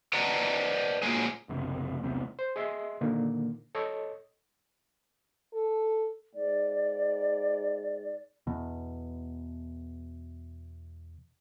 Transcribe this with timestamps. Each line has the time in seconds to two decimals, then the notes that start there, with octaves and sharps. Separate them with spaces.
0.13 B4 D5 D#5 F#5 A5 A#5
1.02 A#2 C#3 F#3 G#3 G#4
1.49 F#1 B1 C3
2.03 B1 E2 C3
2.39 C5
2.56 G#4 D#5 E5 C6
3.01 A#2 D3 D#3 A#3
3.75 A4 C#5 D#5
5.53 A4
6.35 G#2 D5
8.47 E2 B2